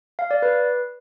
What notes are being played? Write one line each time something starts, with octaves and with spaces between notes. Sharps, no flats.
F5
D5
B4